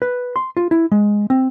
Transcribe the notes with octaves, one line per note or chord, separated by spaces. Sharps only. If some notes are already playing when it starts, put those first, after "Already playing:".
B4
C6
F4
E4
G#3
C4